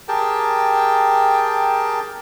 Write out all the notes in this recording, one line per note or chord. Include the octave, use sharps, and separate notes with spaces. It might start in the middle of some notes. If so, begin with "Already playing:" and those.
G4 G#4 A#4 G5 A5